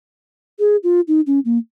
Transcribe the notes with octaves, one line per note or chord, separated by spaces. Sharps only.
G#4
F4
D#4
C#4
A#3